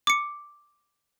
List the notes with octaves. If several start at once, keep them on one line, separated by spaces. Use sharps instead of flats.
D6 C#7